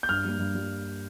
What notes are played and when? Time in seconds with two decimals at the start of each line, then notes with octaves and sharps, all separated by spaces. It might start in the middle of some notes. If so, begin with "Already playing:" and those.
0.03 G6
0.09 G2 F6
0.25 G3 A#3
0.39 G2
0.55 G3